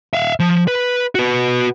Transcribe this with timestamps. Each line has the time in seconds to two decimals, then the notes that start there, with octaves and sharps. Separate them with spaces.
0.13 E5 F5
0.40 F3
0.68 B4
1.15 F#4 B4